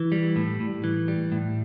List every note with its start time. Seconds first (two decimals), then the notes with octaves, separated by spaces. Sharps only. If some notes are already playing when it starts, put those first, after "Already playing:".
Already playing: E3
0.12 G3
0.36 A2
0.60 A2
0.84 E3
1.08 G3
1.32 A2